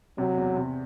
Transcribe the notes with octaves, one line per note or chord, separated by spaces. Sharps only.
C3 F#3
E2
C3